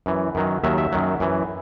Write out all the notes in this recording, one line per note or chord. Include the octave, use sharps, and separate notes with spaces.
F#2 E3
F#2 D#3 F#3
D#2 D#3 F#3 E5
E5
F#2 D#3 F#3
F#2 E3